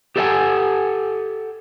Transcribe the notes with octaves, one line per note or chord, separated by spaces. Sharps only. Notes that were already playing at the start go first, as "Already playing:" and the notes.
G4 A4 B4 E5 F#5 G#5